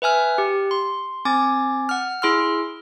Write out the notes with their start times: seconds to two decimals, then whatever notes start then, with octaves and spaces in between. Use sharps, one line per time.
0.02 B4 E5 G#5 F6
0.38 G4
0.71 C6
1.25 C4 G#5 D6 A6
1.89 F#5 F6
2.22 E4 G#4 C6 E6 F6